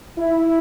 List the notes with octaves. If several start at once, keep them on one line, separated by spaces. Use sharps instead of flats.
E4